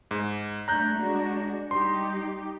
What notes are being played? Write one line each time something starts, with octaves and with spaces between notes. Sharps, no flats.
G#2
G3 A3 D4 A#5 F#6 G6
G#3 D4 F#4
G3 D#4 G4 C6